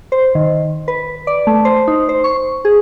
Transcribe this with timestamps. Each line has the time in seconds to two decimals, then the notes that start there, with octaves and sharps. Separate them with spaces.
0.12 C5
0.35 D#3
0.88 B4
1.27 D5
1.47 A3
1.65 C5
1.87 D#4
2.09 C5
2.24 C#6
2.65 G#4